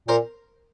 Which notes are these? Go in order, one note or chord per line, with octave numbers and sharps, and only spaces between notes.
A#2 A#4 C5